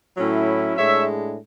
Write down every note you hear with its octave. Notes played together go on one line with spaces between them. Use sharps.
A2 F#3 C#4 E4
A2 G#3 D4 C#5 E5